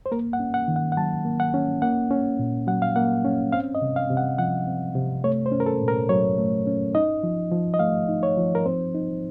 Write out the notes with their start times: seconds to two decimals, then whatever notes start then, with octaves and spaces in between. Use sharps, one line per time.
0.06 C5
0.12 A#3 A#4
0.33 F#5
0.40 C#4
0.54 F#5
0.68 D#3
0.76 F#5
0.92 F#5
0.97 F#3 A5
1.25 A#3
1.40 F#5
1.54 C#4
1.82 A#3 F#5
2.11 C#4
2.39 A#2
2.67 F#3 F#5
2.82 F5
2.96 A#3 F#5
3.25 C#4
3.52 C4 F5
3.75 D#5
3.82 C3
3.96 F5
4.10 C3
4.17 F#5
4.38 F3 F#5
4.67 C4
4.95 C3
5.24 A3 C#5
5.46 C5
5.52 C#4
5.60 A#4
5.66 A4
5.80 A#2
5.88 A#4
6.09 F#3 C#5
6.38 A3
6.67 C#4
6.95 D#4 D#5
7.23 F3
7.51 F3
7.74 D#5
7.79 A3 F5
8.09 D#4
8.23 C#5
8.37 F3
8.55 A#4
8.66 C4 C5
8.94 D#4